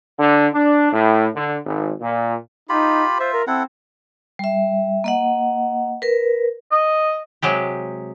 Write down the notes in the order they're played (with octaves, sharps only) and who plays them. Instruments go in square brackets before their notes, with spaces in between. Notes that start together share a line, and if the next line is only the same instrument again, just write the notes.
[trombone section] D3
D4
A2
D3
G#1
A#2
[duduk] D#4 [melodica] F4 G4 B5
[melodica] F4 E5 [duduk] C5
[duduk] A#4
[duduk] C4 [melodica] E4 A4 F#5
[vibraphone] G3 E5
A#3 D#5 F#5
A#4 B4
[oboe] D#5
[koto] C3 F#3 G#3 G4